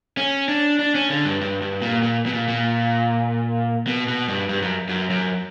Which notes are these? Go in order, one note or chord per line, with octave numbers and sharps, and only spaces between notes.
C#4
D4
D4
C#4
D3
G2
G2
G2
A#2
A#2
B2
A#2
A#2
B2
B2
G2
G2
F#2
F#2
F#2